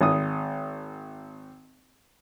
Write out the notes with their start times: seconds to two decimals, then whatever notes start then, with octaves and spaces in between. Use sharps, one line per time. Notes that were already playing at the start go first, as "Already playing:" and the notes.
0.01 G#1 D#6